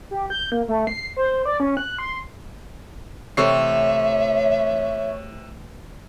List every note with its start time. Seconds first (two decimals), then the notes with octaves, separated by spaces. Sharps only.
0.11 G4
0.30 G6
0.52 A#3
0.68 A3
0.87 C7
1.17 C5
1.45 D5
1.60 C#4
1.77 F#6
1.99 C6
3.37 C3 E3 A3 C#5 E5 C#6 C7